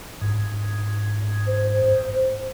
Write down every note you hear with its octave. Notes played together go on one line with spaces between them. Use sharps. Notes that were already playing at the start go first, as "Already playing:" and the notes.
G#2
C5